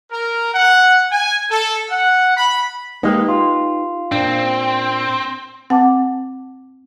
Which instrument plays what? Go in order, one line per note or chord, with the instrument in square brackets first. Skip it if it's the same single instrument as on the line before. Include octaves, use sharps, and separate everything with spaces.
[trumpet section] A#4
F#5
G#5
A4
F#5
B5
[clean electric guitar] G#3 A#3 [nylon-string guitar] D#4 G4 B4
[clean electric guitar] F4
[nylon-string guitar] A#2 D4 [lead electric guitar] C4
[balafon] C4 [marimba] F#5 A5 D6